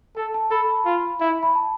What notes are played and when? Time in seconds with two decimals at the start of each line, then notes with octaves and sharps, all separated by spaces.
0.17 A4 A5
0.34 A5
0.51 A4 B5
0.85 F4
1.21 E4
1.43 B5
1.55 A5